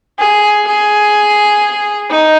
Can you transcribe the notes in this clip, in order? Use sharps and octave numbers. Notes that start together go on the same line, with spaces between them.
G#4
G#4
D#4